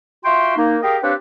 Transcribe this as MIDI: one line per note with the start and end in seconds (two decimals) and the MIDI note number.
0.24 0.56 65
0.24 0.56 66
0.24 0.56 76
0.24 0.56 79
0.24 0.56 84
0.57 0.77 58
0.57 0.77 63
0.83 0.96 67
0.83 0.96 68
0.83 0.96 70
0.83 0.96 75
0.83 0.96 77
0.83 0.96 79
1.02 1.13 60
1.02 1.13 62
1.02 1.13 67
1.02 1.13 71
1.02 1.13 73
1.02 1.13 77